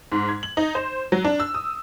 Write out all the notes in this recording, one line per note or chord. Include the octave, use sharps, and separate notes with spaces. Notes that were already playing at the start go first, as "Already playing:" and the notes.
G#2
G#6
F#7
D#4
C5
F#3
D4
E6
D#6